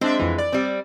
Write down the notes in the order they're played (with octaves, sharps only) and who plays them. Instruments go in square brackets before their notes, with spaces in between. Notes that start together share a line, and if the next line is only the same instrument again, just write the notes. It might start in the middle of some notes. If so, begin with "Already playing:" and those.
[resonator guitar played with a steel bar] G#3 [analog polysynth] C4 D4 E5
[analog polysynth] F2 E3
D5
[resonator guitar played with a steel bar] G3 C4